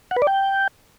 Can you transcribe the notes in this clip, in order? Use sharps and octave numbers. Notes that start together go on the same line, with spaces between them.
F#5
B4
D5
G5